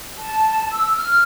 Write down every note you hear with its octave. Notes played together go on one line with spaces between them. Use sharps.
A5
E6
F6